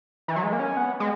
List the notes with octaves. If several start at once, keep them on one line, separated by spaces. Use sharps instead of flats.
E3
F#3
G#3
A#3
C#4
B3
G#3